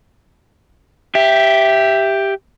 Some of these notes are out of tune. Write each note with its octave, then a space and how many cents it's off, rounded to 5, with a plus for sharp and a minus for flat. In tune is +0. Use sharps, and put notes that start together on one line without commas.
G4 +0 E5 +5